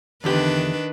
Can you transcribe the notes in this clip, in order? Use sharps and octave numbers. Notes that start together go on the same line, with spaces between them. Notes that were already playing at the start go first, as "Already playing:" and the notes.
E2 D3 D#3 D4 G4 B4